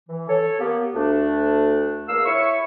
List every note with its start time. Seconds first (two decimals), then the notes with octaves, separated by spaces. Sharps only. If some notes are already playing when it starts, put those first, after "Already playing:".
0.08 E3
0.28 A4 C#5
0.59 A#3 B3 G4
0.93 D2 A3 D4
2.08 E2 A#3 F5 E6
2.26 E4 C#5 C#6